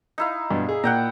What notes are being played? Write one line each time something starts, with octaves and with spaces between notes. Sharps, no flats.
D#4 E4 F5
G2 B2
G#4
A#2 F#5 G5 A#5